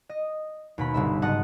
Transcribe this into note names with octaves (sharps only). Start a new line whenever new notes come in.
D#5
D#2 B2 B5
G1 C2 E5
F#1 G#2 D#5 F#5 A5 D#6